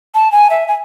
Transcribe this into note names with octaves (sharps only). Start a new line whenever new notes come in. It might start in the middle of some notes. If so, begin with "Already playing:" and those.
A5
G#5
E5
G#5